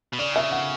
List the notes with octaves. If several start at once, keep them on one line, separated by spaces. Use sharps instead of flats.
B2
C#3 D5
E5
F#5